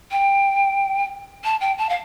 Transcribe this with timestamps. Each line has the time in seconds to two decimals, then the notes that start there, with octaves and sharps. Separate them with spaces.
0.11 G5
1.44 A5
1.60 G5
1.78 A5
1.89 F5